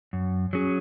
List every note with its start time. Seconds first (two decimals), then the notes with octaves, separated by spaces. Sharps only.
0.13 F#2
0.53 F#3 C#4 G#4